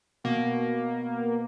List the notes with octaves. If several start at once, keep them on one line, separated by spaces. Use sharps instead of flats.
B2 A#3